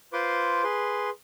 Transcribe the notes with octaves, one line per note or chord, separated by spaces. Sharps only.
F4 B4 C5 C6 D6
G#4 B4 C6